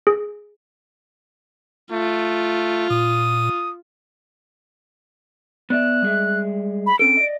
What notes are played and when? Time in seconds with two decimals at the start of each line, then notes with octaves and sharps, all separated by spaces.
0.07 G#4
1.92 A3 F4
2.90 A#2 D#6
5.70 B3 D5 E5 F#6
6.02 G3 G#3 E5
6.87 B5
6.99 C4 C#4 A4 D7
7.17 D5 D#5